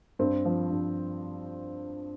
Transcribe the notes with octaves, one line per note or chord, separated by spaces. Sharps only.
G2 C4
F3
G2